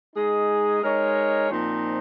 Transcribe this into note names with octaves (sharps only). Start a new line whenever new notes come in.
G#3 D#4 G#4
G#3 D#4 A#4 C#5
A#2 F3 C4 D#4